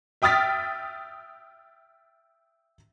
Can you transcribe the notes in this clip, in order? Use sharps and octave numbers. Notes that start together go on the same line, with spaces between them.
E5 G5 D#6 F6 A6 B6